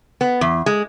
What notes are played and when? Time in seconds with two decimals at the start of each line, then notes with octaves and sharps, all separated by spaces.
0.21 B3
0.41 E2
0.66 G#3